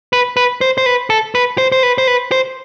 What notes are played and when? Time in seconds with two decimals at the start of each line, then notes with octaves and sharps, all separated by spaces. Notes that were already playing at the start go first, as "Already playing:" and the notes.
0.13 B4
0.37 B4
0.61 C5
0.78 C5
0.86 B4
1.10 A4
1.35 B4
1.58 C5
1.72 C5
1.83 B4
1.98 C5
2.07 B4
2.32 C5